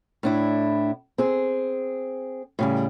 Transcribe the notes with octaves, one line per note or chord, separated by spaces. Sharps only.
A2 D4 E4
C4 G#4
A2 C#3 G3